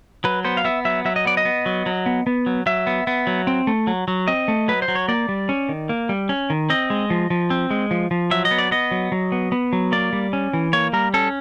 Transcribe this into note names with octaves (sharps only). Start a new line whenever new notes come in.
F#3 B4
B3 C5
F5
B3 E5
F#3 E5
F#3 E5
D#5
B3 D5
D#5
B3
F#3
F#3
B3
B3
F#3
F#3 E5
B3
B3
F#3
C4
A3
F#3
F#3
C4 D#5
A3
F#3 B4
C5
F#3
C#5
A#3 D5
G3
C#4
D#3
A#3
G3
C#4
D#3
C4 D#5
G#3
F3
F3
C4
G#3
F3
F3
F#3 E5
D#5
B3
D5
B3 D#5
F#3
F#3
B3
B3
F#3
A#3 D5
G3
C#4
E3
A#3 C#5
G3 A#4
C#4 A4